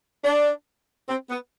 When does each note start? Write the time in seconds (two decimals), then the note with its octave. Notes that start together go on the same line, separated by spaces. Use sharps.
0.24 D4
1.09 C4
1.30 B3